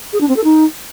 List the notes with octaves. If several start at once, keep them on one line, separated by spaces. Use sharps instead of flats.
G#4
D4
C4
A4
D#4